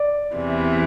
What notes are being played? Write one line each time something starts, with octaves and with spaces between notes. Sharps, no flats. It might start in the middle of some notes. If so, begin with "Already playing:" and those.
Already playing: D5
E2 C3 E3